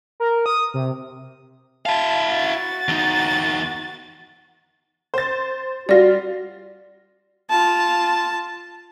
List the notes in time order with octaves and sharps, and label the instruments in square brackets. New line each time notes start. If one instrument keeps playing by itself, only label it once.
[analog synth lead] A#4
D#6
C3
[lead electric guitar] E4 F5 [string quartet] A5
[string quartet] F#4 A6
[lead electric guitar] E2 D#4
[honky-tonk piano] C5 A6
[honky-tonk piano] G3 F4 [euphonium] F#4 [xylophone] D5 A#6
[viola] F4 A5